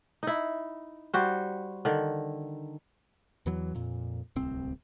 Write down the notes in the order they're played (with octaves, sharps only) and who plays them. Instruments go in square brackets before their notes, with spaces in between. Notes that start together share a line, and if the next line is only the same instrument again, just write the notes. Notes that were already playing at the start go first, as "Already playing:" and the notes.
[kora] D#4 E4
G3 F#4 C5
D3 D#3
[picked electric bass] E2 E3 F#3
F2 A#2
D1 C2 C4